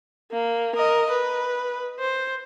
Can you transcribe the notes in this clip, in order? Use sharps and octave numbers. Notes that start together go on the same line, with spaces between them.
A#3
A#4 D#5
B4
C5